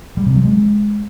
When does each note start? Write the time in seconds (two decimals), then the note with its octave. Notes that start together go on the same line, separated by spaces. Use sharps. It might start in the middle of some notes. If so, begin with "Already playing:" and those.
0.17 G3
0.26 C3
0.35 F#3
0.45 G#3